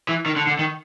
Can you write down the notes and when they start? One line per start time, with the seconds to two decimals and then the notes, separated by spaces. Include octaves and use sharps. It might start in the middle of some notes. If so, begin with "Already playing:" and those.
0.09 E3
0.26 D#3
0.36 D3
0.47 D3
0.59 D#3